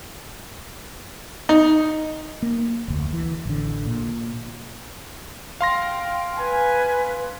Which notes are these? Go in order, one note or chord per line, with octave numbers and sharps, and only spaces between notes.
D#4
A#3
F1 D2
E3
A1 D3
A#2
F5 G5 C6 A#6
B4 G#5